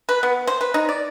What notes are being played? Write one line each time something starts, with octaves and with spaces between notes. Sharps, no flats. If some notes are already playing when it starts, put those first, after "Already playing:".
B4
B3
C5
B4
D#4
D5